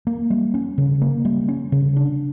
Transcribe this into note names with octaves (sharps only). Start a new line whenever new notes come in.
A#3
G3
C#4
C#3
A#3
G3
C#4
C#3
D4